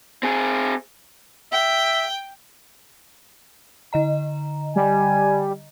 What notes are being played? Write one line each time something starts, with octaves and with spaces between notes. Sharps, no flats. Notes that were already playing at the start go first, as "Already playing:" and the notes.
C4 G#4
E5 G5
D3 D#5 A#5
G3 G#5